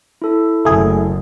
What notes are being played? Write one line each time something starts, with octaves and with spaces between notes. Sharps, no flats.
E4 A4
F#1 A3 G#4